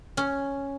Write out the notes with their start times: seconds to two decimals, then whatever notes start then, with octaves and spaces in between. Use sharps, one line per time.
0.17 C#4